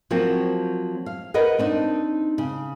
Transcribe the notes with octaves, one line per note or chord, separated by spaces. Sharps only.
F3 F#3 A#3 C4 F#4
F5
A#4 B4 D#5 F#5
C4 D4 D#4
C#3